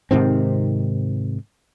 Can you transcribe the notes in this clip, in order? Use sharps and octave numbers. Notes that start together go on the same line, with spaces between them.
G#2 C3 D#3 C4